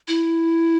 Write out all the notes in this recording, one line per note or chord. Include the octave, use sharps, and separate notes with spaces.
E4